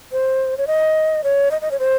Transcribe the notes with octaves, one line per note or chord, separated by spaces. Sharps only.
C5
C#5
D#5
C#5
D#5
D#5
C#5
C5